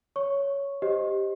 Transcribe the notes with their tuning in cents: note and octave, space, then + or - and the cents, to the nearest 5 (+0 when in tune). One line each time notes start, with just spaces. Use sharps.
C#5 +10 C#6 -5
G4 +0 C5 +0 D#5 +0